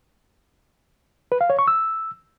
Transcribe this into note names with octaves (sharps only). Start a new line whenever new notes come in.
B4
F5
C#5
C#6
E6